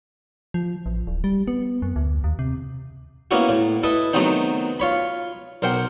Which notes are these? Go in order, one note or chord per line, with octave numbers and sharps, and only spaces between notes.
F3
A1
D1
G3
B3
F#2
D2
D#2
C3
A#3 B3 C#4 E4 F#4
A2
E4 A4 B4 D#5
D#3 F#3 A3 B3 C4 D#4
F4 C#5 B5
B1 A#4 C5 F#5 G5